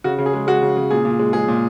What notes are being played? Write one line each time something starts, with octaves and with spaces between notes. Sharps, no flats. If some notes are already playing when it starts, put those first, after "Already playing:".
C#3 F#4
C#3
G#4
G#3
G#3 F#4
C#3
C#3
A#2 G#4
A#2
G#3
G#3 G#4
A#2